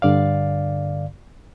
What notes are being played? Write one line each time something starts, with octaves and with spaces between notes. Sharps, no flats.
G2 D3 D5 F5